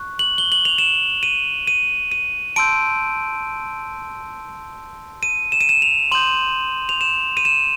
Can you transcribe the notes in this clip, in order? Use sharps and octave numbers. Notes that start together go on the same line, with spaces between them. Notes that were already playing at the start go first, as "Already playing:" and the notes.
Already playing: C#6 F#6
F#7
G7
F#7
F7
E7
D#7
D#7
D#7
A5 C6 E6 G6 D7
D#7
E7
D#7
E7
F7
C6 D#6 G6 F#7
F7
E7
D#7
E7